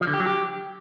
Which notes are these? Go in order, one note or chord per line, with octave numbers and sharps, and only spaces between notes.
F3
D3
G4
F#3
G4